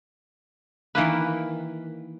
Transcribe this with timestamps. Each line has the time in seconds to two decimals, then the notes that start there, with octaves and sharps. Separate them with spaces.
0.95 D#3 E3 A#3 B4